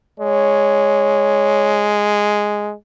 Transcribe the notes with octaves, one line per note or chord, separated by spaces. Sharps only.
G#3 C#5